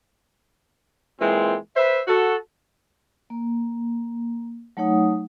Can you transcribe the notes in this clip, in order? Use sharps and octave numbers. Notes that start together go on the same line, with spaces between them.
A#2 E3 G#3 C4
B4 C5 E5
F#4 A4
A#3
F#3 A3 D#4 C#5 F#5 D#6